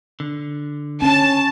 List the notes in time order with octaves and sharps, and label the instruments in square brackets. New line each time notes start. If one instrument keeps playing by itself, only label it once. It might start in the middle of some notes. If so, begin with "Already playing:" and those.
[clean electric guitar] D3
[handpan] C#4 [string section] A5